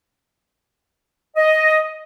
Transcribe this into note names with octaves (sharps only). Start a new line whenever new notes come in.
D#5